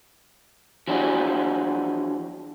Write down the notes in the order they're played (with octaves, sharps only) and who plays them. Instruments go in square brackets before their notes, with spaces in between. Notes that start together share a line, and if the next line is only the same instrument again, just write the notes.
[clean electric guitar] E3 F3 D4 F#4 G#4